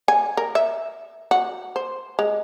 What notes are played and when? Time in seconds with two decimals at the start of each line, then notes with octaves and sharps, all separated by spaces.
0.08 G#5
0.37 A#4
0.55 E5
1.31 F#4
1.76 C5
2.19 G#3